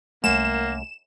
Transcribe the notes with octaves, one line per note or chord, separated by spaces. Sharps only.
C2 F#2 A3 A#3 E7